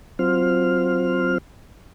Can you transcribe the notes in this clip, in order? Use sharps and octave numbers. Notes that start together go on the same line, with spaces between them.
F#3 C4 F4 C5 F6